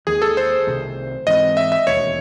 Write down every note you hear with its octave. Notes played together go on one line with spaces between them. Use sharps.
D#2 D#3 G#3 G#4
A4
C5
C2 C3 D#3 A3
G#2 E3 C4 D#5
E5
E5
E1 D#2 D#3 A3 C#5